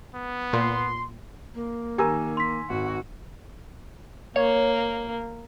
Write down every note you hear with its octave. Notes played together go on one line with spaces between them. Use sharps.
B3
A#2 C6
A#3
D#3 G4 A#4 G#5 A#5 E6
C6 B6
G#1 F#4
A#3 C#5